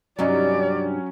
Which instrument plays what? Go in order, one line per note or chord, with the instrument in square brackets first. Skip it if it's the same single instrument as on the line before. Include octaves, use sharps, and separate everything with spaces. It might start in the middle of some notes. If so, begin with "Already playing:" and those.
[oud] G2 C3 D#4 [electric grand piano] F#3 C#4 [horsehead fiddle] D5